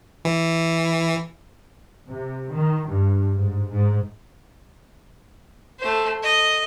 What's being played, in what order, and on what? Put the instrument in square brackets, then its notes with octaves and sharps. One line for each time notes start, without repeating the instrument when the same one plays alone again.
[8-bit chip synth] E3
[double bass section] C3
D#3
G2
G#2
G#2
[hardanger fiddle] A3 C5
D#5